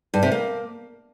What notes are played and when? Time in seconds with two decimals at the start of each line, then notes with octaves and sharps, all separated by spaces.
0.14 G2
0.23 C3
0.32 A#3